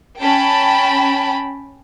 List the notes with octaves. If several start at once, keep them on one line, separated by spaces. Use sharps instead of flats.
C#4 G5 A5 B5